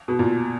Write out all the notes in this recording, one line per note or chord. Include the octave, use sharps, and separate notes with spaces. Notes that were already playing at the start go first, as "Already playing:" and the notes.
B2
A#2